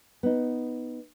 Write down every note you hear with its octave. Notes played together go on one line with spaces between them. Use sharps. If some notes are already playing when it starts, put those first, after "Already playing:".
B3 D#4